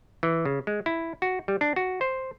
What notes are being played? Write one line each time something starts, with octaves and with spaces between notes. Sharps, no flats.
E3
C#3
G#3
E4
F#4
G3
D4
F#4
C5